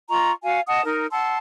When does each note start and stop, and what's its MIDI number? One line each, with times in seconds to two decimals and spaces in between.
0.10 0.32 65
0.10 0.32 75
0.10 0.32 82
0.10 0.32 85
0.44 0.60 66
0.44 0.60 77
0.44 0.60 80
0.67 0.83 75
0.67 0.83 78
0.67 0.83 81
0.67 0.83 87
0.85 1.06 63
0.85 1.06 70
1.12 1.37 78
1.12 1.37 81
1.12 1.37 84
1.12 1.37 88